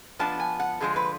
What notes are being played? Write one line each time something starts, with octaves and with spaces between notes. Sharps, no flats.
F3 B3 D4 A5
G#5
F#5
D3 F3 G#3 G#4
B4